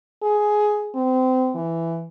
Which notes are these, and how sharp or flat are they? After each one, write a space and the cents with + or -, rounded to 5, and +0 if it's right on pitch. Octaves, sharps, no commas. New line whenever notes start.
G#4 +10
C4 -25
E3 +10